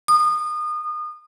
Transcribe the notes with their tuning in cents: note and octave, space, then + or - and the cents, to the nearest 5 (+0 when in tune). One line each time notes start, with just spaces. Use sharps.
D#6 -30